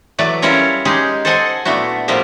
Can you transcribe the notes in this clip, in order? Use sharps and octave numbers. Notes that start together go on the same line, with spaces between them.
E3 F#3 A3 B4 D5
G3 C#4 E4 F4 A#4 C#5
G#3 C#4 D#4 G4 G#4
A4 C5 D#5 F#5 G#5 A5
A#2 A3 B3 D4 E4 F#4
A2 F3 G3 B3 A#4 E5